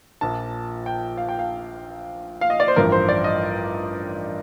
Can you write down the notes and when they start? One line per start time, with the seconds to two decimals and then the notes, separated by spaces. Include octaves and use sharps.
0.21 A#1 A#2 F3 A5
0.86 G5
1.17 F5
1.29 G5
1.39 F5
2.41 F5
2.50 D#5
2.60 D5
2.68 C5
2.76 A1 G2 F3 A#4
2.92 C5
3.09 D5
3.24 D#5